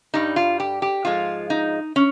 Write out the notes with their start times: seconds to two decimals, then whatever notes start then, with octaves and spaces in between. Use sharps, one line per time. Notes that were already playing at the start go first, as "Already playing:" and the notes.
0.14 G2 G3 D#4
0.36 F4
0.60 G4
0.82 G4
1.05 G#2 F3 G#3 F4
1.50 D#4
1.96 C#4